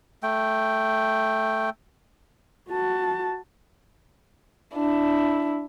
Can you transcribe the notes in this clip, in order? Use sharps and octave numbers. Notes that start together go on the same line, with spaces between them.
A3 G5
F#4 A5
D4 E4